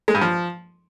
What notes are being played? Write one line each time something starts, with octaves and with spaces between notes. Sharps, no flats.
G#3
G2
F3